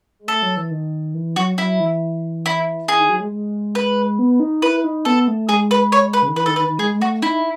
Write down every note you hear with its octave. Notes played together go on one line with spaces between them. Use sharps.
G#3
A3 A4
F#3
E3
D#3
E3
F#3 F#4
F#3 E4
E3
E4
E3 G#4
D#3
F#3
G#3
G#3
B4
B3
D#4
E4 B4
D#4
B3 A4
A3
G#3 G#4
B4
C#5
B4
C#3
D#3
E3 B4
D#3 A4
D#3 B4
D#3
G#3 G#4
G#3
A3 F#4
D#4 E4